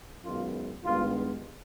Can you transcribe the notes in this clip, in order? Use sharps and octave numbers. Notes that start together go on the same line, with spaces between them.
F#2 D#3 G#3 B3 F4
G2 D#3 G#3 B3 F4